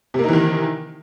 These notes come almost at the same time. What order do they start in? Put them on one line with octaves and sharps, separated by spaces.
C3 A#3 D#4 E3 D#3